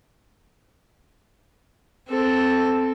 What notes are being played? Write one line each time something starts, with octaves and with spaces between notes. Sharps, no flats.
C4 A4